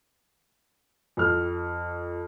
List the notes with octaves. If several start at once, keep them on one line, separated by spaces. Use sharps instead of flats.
F2 F6